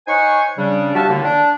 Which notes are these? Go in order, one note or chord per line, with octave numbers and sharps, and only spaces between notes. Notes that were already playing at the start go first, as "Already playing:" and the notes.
D#4 C5 C#5 F#5 G#5 C#6
C#3 G3 D4
F#4 G4 E5 F5 A5
A2 D3 D#3 A#3
D4